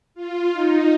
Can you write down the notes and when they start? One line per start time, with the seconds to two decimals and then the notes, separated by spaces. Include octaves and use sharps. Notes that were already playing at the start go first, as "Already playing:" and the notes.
0.14 F4
0.52 D#4